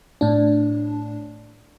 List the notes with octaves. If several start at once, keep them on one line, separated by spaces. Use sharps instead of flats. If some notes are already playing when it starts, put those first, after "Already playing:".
A2 D4